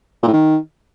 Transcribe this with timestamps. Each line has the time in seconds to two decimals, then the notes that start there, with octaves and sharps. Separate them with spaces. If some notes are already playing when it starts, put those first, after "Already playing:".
0.22 A#2
0.28 A2
0.33 D#3